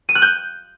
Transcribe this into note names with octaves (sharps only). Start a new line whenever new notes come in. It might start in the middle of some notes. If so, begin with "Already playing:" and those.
D#7
F#6
G6